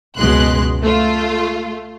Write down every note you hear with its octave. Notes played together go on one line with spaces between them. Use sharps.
C#2 F#2 B2 G#3 C6 F#6
A3 F4